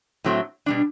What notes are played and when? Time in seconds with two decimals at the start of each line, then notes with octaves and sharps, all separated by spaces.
0.24 A2 F#3 A3 C4
0.66 B2 G3 D4